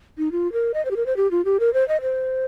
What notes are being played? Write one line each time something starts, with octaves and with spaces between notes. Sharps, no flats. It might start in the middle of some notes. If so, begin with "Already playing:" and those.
D#4
F4
A#4
D#5
C5
G4
A#4
C5
G4
F4
G4
A#4
C5
D#5
C5